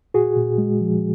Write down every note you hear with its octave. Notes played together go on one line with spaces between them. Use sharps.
A#2 F#4 G#4
A#2
G#3
F3